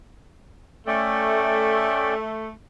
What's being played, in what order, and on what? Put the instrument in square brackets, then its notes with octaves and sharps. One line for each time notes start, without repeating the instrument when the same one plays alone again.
[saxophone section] A3 [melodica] C#4 D5 G5